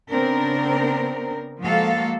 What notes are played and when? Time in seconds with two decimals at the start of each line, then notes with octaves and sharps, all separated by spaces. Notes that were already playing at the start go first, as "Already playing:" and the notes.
0.11 C#3 B3 C4 D4 A#4
1.61 F3 G#3 A#3 F#4 A4 F5